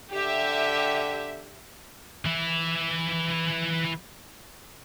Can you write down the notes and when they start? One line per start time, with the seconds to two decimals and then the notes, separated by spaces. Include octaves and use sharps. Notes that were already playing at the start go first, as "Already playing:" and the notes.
0.12 D3 G4 E5
2.26 E3 E4